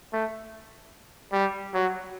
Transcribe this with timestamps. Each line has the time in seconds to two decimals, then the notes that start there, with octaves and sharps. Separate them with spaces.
0.13 A3
1.33 G3
1.74 F#3